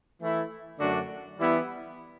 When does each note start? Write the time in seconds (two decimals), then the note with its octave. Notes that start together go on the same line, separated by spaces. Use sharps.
0.21 E3 A3 E4
0.79 F#2 D3 A3 D4 F#4
1.38 E3 G3 B3 E4